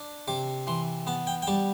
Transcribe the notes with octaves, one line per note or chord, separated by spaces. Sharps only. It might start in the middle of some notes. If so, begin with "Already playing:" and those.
Already playing: D4
C3 D6
E3 C6
B3 A5
G5
G5
G3 A5